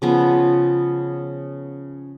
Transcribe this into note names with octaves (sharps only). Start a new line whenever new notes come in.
C#3 F3 B3